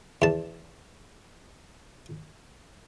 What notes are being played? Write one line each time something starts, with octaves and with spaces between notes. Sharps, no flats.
E2 A5